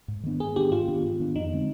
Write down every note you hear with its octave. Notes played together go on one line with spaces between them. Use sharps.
G#2
D#3 B3 D4
G#2 G#4
D#3 B3 D4 G4
G#2 F4
D#3 B3 D4
G#2
D#3 B3 D4
F2 D#4
D3 G#3 C4